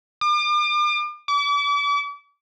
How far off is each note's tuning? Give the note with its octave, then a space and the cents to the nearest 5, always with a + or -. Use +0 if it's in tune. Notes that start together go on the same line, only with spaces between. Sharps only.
D6 +40
D6 -40